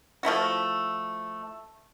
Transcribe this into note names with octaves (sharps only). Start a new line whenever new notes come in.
F3 A3 E4 F#4